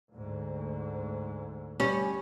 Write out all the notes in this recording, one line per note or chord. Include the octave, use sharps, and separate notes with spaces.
D2 G#2
G3 C#4